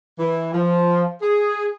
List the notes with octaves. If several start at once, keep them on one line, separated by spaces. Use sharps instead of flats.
E3
F3
G#4